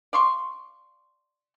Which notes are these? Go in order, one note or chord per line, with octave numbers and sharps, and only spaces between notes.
D5 F5 C6 C#6